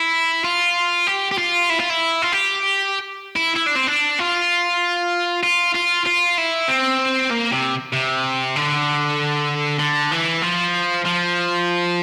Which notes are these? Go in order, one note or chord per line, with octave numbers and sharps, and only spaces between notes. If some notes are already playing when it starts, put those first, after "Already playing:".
Already playing: E4
F4
G4
G4
F4
E4
F4
E4
F4
G4
E4
E4
D4
C4
D4
F4
F4
F4
F4
E4
C4
A#3
C3
C3
D3
D3
E3
F3
F3